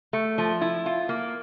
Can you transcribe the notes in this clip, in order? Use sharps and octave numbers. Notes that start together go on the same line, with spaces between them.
A3
F3
E4
F4
A#3